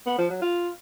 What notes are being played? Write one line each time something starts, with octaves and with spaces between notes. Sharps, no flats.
B3
F3
F#3
F4